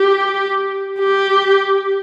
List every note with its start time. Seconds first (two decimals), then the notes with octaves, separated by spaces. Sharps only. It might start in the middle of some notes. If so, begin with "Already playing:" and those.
Already playing: G4
0.99 G4